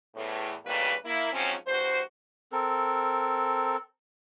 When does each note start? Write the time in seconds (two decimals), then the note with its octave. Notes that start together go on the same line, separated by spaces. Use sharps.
0.16 E2 A2
0.66 D#2 A2 C#3 G3 A#3 B4
1.05 A#3 E4
1.33 G#2 F3 F#3 C4 C#4
1.67 E2 G2 F#4 C5
2.52 C4 A4 A#4